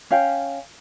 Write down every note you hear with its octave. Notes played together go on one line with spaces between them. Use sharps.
C#4 F5 G5